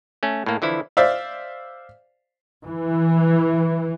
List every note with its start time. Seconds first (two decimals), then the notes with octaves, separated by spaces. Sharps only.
0.23 A3 C#4
0.46 A2 A#3
0.62 D3 E3 F3 E4
0.97 C5 D5 E5 F5
2.66 E3